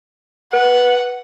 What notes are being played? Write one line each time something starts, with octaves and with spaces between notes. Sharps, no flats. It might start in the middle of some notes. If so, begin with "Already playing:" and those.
B4 F#5